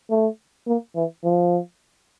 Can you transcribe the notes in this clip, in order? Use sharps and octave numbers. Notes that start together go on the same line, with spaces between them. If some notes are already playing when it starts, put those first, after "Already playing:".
A3
A#3
E3
F3